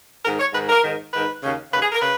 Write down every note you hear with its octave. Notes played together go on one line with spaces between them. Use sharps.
G#2 D#3 A#4
C#5
G#2 D#3 B4
A#4
G#2 D#3
G#2 D#3 B4
D#2 C#3
D#2 C#3 B4
G#4
A#4
C#3 B4